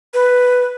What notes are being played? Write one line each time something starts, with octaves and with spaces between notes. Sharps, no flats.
B4